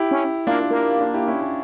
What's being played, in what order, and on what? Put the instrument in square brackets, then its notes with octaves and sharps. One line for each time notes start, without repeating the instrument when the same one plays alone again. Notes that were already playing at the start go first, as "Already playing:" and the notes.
Already playing: [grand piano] E4 G4
[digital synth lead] C#4
[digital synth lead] A#3 [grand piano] D4 F4
[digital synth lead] A#3
[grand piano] D4 F4
E4 G4
C#4 E4
C#4 E4